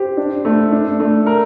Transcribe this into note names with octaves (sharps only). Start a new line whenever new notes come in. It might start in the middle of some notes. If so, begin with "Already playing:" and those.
Already playing: G4 C5
D4
A3
D4
A3
A#4